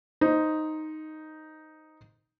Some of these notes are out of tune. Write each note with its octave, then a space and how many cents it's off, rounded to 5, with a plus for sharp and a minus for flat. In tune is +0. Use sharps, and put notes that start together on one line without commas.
D#4 +0 C5 +0